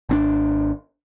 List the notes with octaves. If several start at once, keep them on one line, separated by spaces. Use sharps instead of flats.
G#1 C4 D4